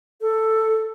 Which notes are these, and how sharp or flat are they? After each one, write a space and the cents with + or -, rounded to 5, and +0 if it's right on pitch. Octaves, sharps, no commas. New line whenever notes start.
A4 +5